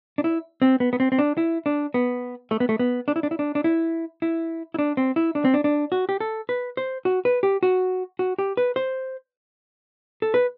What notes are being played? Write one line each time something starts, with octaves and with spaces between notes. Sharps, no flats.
D4
E4
C4
B3
B3
C4
C4
D4
E4
D4
B3
A3
B3
A3
B3
D4
E4
D4
E4
D4
D4
E4
E4
E4
D4
C4
E4
D4
C4
D4
D4
F#4
G4
A4
B4
C5
F#4
B4
G4
F#4
F#4
G4
B4
C5
A4
B4